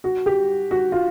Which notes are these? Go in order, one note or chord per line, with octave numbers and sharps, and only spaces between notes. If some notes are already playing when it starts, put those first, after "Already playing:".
F#4
G4
F#4
F4